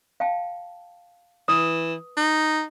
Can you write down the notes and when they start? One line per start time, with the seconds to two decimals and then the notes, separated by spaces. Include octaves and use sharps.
0.20 F5 G5 A5
1.48 E3 B4 D#6
2.17 D#4